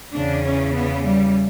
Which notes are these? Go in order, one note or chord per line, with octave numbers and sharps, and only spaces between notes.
E2 C#3 E3 D4
C#4
B3
G3